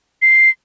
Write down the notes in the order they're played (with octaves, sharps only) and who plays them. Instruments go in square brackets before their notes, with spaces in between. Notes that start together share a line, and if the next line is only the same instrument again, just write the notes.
[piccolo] C7